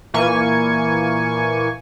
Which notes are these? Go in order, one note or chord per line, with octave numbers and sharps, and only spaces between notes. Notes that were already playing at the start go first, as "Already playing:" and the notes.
A#2 E3 A#3 G#5 C#6